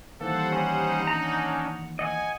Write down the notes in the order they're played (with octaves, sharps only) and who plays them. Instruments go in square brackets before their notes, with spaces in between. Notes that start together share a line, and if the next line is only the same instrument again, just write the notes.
[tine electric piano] D#3 E3 A#3 [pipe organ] G3 C5 F#5 [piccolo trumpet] A4
[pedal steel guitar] C#4 [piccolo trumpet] D#4
[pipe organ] C#4 D4 [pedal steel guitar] F#5 A#5
[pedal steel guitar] D#5 F#5 D#6 [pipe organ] G#5